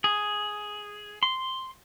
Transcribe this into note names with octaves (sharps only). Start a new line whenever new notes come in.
G#4
C6